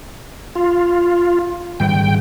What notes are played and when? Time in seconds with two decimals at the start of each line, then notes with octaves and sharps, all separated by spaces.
0.55 F4
1.80 G#1 G3 G5